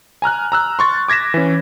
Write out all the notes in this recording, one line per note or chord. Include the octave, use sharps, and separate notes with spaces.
G#5 A#5 F6 F#6
A#5 E6 F#6
C6 C#6 A6
D6 G#6 A#6 B6 E7
E3 C#4